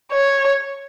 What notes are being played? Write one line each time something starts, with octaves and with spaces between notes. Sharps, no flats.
C#5